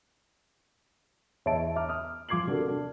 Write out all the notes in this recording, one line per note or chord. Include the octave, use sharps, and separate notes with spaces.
E2 C#5 D#5 E5 A5 D7
E5 A#5 D6 F6
D#6 F6
F3 F4 D6 G#6 C7 F#7
C3 D4 F#4 A4 A#4
D4